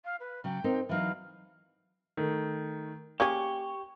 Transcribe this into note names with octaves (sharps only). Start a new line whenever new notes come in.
F5
B4
C#3 F#3 G5
C4 D#4 A#4
E3 F#3 D#4 F5
D#3 A3
A#3 C#4 G4 G#4 C#6